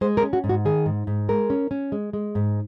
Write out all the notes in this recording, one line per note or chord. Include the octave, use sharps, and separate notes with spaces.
G#3 C5
A#4
C#4
F#4
G#2
F#4
D#3 G#4
G#2
G#2
G#3 A#4
C#4
C#4
G#3
G#3
G#2